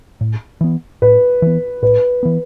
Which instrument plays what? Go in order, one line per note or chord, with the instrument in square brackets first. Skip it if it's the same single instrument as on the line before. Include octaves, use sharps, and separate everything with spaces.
[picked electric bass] A2
E3 B3
[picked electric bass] A2 [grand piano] B4
[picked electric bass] E3 B3
[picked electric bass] A2 [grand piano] B4
[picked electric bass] E3 B3